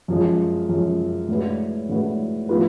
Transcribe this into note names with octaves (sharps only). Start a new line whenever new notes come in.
F#2 F3 G#3
F#2 F3 G#3
A2 G#3 D4 F#4 B4
A2 G#3 D4 F#4 B4
A2 F3 B3 F4 B4